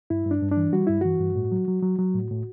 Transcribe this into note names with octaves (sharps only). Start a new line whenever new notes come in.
G2 E4
G2 D4
G2
D4
E3
G3 F#4
G2 E4
E3 F#4
G2
A2
F#3
F#3
F#3
F#3
A2
A2